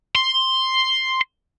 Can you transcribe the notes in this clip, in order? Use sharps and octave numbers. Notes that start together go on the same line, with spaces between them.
C6